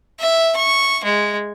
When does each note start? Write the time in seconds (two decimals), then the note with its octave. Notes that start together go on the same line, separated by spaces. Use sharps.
0.20 E5
0.56 C#6
1.04 G#3